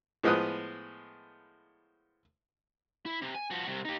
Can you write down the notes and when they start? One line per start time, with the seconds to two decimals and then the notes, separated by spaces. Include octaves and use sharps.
0.23 A2 F3 G#3 B3 D#6 F#6
3.06 E4
3.22 C3
3.35 G#5
3.50 F3 F#4
3.67 C2 C3
3.85 D#4 G4